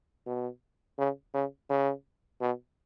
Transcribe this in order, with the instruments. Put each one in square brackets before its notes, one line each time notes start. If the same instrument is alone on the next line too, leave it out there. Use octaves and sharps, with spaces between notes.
[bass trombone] B2
C#3
C#3
C#3
B2